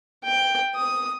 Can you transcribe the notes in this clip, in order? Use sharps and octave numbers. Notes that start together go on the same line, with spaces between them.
G5
D#6